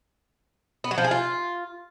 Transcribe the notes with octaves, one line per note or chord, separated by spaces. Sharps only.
B3
F#3
F3
G#4
F4